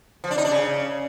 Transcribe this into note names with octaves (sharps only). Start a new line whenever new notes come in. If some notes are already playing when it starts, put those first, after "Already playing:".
F3
D4
D#4
D4
C#3